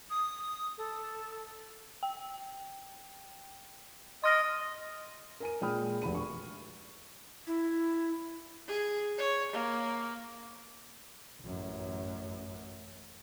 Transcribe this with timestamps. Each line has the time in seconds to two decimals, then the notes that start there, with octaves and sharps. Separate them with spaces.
0.10 D#6
0.78 A4
2.03 G5
4.24 D#5 C6 F6 A#6
5.40 A#4 G#5 D#7
5.61 A#2 G#3 G5 B5 D#6 F6
6.02 F1 D2 B5 D#7
6.15 C#6
7.47 E4
8.68 G#4
9.18 C#5
9.52 A#3
11.42 A1 F#2